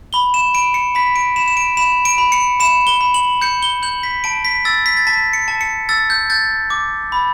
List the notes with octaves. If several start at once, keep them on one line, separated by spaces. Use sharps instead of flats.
B5 G7
E7
B5 D7
C#7
B5 B6
D7
B5 E7
E7
D7
B5 E7
D7
B5
C#7
B5 E7
G7
B5
F#7
G6 C#7
G7
G6 F#7
B6
A5 D7
B6
E6 A6
B6
A6
A5 B6
C#7
A5
C#7
E6 A6
G6
G6 A6
D6
B5